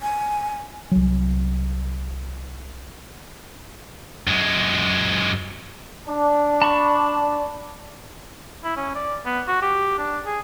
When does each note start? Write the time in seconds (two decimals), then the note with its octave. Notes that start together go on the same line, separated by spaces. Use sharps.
0.02 G#5
0.92 C2 F#3
4.27 F#2 G#3
6.07 D4
6.62 A5 B5 C#6
8.64 E4
8.77 C#4
8.95 D5
9.26 B3
9.48 F#4
9.62 G4
9.98 D4
10.26 G#4